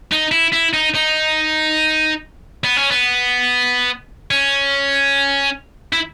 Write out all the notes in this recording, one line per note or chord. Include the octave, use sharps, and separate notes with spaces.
D#4
E4
E4
D#4
D#4
B3
C#4
B3
C#4
E4